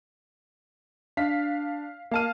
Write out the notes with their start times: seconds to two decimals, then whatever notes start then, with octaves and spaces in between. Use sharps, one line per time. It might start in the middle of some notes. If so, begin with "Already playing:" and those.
1.17 D4 F5 B6
2.11 A#3 F5 A5 F6 D#7